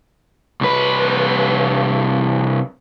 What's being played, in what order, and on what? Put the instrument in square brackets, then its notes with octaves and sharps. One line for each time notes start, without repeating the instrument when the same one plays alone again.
[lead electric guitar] C2 B4